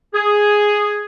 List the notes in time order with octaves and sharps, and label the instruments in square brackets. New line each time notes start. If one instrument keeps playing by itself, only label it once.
[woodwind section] G#4